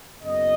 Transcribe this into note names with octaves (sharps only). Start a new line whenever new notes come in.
F#1 F#2 C#3 B3 D#5